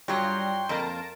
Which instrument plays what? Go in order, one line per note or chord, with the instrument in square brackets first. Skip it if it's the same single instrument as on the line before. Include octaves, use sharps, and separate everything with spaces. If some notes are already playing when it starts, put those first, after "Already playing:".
[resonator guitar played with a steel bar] G2 F#3 C#5 [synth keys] G3 F4 A#6 [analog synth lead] G5 [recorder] C6
[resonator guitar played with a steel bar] F2 A#3 [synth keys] A5 A#6 D7